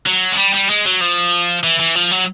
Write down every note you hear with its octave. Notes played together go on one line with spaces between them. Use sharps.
F#3
G#3
G3
G3
G#3
F#3
F3
E3
E3
F3
F#3